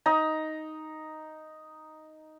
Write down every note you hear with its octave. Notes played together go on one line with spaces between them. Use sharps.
D#4 A#5